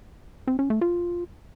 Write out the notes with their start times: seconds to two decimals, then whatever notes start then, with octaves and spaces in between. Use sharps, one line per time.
0.47 C4
0.59 C#4
0.70 A3
0.81 F4